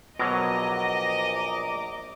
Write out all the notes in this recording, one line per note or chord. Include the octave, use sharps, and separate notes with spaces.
A#1 B2 F#3 D#5 A#5 D6